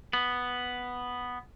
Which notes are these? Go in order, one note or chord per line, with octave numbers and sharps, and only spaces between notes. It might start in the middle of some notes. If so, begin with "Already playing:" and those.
B3